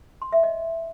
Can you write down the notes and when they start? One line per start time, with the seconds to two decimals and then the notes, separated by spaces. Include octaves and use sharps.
0.22 C6
0.32 E5
0.43 D#5